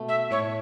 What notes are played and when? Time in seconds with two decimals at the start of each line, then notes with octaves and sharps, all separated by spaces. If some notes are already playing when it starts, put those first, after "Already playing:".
Already playing: B2 A3
0.08 E5
0.31 A2 C#5